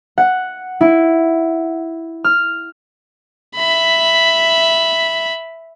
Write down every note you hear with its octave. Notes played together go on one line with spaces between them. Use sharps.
F#5
E4
F6
E5 B5